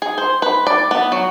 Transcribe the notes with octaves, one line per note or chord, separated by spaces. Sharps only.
G#4
C5
B4
D5
B3
F#3